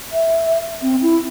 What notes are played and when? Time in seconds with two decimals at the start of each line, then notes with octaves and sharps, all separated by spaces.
0.12 E5
0.82 C4
1.02 E4